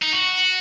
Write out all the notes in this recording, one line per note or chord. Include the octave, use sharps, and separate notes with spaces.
D#4
F#4